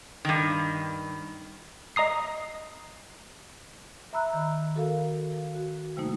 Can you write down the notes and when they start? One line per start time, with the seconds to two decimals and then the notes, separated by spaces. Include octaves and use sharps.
0.25 G2 D#3
1.96 D#5 A#5 D#6 C7
4.13 E5 A#5 B5 E6 F#6
4.33 D#3
4.76 F#4 A4 A#4 F5
5.55 F#4
5.97 C3 G3 A3 A#3 D#4